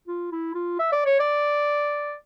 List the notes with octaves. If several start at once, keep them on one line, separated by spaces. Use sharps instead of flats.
F4
E4
F4
E5
D5
C#5
D5